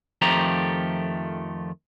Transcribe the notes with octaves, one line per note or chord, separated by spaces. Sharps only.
F2 D#3 F3 A3 G4 A#5